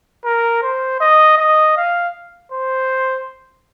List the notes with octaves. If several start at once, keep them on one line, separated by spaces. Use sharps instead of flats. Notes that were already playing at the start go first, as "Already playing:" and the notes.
A#4
C5
D#5
D#5
F5
C5